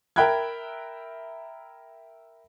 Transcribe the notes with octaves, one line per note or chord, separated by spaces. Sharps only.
A#4 E5 G5 B5 F#6 G#6